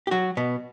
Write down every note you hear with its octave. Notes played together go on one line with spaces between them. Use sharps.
G4
F#3 F#4
B2 B3